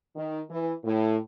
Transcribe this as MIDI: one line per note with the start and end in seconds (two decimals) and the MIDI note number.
0.16 0.41 51
0.50 0.73 52
0.84 1.17 45